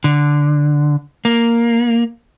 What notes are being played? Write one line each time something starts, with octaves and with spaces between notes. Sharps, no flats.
D3
A#3